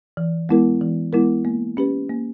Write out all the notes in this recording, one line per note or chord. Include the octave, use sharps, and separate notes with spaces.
E3
G#3 B3 E4 A#4
E3
G#3 B3 E4 A#4
A#3
C#4 G4 B4
A#3